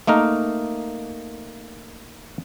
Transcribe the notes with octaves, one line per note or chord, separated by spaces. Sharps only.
A3 A#3 D#4 A#4